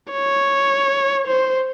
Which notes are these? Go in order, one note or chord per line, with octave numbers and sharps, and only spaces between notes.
C#5
C5